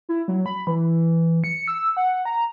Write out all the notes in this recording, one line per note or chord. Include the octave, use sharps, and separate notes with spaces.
E4
F#3
B5
E3
C#7
E6
F#5
A#5